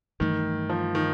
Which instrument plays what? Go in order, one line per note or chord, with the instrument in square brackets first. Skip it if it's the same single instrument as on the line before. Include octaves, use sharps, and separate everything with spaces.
[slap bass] G2 E3 A3 [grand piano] D#3
[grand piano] F3
D#3